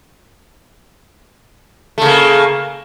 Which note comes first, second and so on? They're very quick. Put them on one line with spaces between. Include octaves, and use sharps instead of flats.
A3 C#3 A#3